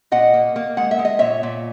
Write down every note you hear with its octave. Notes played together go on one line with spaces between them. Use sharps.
A#2 D#5 F#5
A#3
A#3
G#3 F#5
E5
G#3
D#5
A#2 C#5 E5
A#2